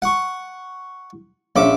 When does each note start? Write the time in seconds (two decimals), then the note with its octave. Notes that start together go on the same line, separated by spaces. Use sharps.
0.02 F#5 C#6
1.56 A#1 C#4 E5 D6